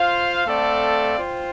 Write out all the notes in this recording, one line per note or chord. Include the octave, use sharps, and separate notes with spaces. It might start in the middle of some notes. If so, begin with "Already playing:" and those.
Already playing: F4 C5 F5
A3 C4 A4 D5 F5
F4 C5 G5